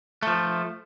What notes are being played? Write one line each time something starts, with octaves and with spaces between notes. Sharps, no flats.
F3 A3